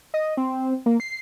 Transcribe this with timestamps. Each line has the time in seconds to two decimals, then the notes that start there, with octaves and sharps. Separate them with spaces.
0.14 D#5
0.37 C4
0.86 A#3
1.00 C7